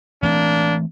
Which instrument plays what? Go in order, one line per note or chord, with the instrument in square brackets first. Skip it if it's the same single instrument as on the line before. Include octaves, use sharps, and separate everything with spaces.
[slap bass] E3 A3 C4 [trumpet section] A#3 D4